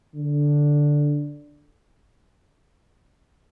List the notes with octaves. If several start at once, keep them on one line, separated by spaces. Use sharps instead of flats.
D3